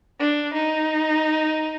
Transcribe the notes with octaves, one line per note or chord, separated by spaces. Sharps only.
D4
D#4